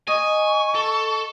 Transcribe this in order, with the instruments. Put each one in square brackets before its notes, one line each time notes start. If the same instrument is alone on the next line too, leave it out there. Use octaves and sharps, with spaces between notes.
[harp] D#5 [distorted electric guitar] G#5 [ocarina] C#6
[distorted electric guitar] A4